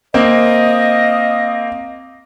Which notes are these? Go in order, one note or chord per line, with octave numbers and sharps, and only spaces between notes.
A#3 C4 D#5